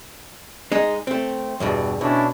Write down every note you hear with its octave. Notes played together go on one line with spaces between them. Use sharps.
G#3 D#4
A3 C4
E2 G2 B2
B2 C#4 D4 E4